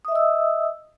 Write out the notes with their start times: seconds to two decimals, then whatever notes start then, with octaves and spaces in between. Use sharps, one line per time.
0.05 D#6
0.08 E5
0.12 D#5
0.15 E6